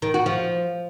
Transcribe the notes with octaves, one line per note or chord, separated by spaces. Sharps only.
D#3
F#4
F3